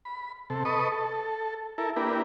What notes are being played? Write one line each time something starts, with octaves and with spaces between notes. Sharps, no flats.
B5
C3 A4
A4 B4 D#5 C#6 D#6
A4
E4 A4 A#4
A#3 D4 E4 G4 A#4 B4